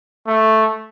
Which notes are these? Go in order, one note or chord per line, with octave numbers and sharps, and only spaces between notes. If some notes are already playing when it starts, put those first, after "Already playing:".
A3